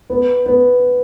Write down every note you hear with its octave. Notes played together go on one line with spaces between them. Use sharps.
B3
B3